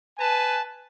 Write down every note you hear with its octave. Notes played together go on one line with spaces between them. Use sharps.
B4 G#5 A5